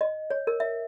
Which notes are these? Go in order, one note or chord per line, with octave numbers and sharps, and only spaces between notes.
D#5
C#5
A#4
E5